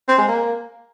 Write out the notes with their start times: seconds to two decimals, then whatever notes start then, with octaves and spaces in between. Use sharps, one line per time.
0.08 C4
0.18 G#3
0.28 A#3